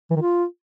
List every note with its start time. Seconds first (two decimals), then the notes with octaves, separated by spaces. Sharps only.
0.11 E3
0.16 D#3
0.22 F4